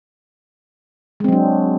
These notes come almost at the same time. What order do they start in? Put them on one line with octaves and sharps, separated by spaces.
G#3 C4 F#3 D4